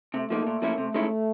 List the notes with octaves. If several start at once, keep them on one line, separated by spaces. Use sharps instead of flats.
C3 A3
F3 A#3 D#4
A#2
F3 A#3 C#4 E4
C3 A3
D#3 G#3 C#4 E4